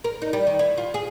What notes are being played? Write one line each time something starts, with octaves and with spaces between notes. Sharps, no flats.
A#4
D#4
G3
D#3
E4
F4
G#4